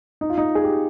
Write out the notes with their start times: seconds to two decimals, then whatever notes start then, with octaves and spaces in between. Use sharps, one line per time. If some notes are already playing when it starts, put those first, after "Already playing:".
0.21 D#4
0.30 F4
0.38 D#4
0.55 G#4
0.64 G4